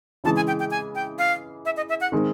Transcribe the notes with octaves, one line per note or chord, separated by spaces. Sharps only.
C#3 E3 G#3 A5
G#5
G5
G5
G#5
G5
F5
E5
D#5
E5
F#5
D#3 G#3 C4